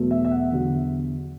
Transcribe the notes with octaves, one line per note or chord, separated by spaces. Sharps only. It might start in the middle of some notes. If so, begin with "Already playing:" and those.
Already playing: E2 B2 F#3 A3
E5
E5
F#5
E2 D3 F#3